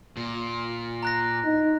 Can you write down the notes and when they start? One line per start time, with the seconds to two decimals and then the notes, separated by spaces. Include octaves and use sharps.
0.17 A#2
1.03 A#5 F#6 A#6
1.45 D#4